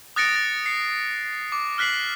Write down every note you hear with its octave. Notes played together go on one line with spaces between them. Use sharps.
D#6 F#6 A6 A#6 C#7 D7
A6
C7 C#7
D6
F6 F#6 B6 C7 F#7